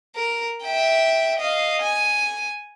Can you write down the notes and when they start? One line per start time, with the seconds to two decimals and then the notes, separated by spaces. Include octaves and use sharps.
0.16 A#4
0.63 E5 G5
1.39 D#5 F5
1.82 G#5